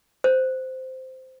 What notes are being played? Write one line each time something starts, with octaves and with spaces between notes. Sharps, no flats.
C5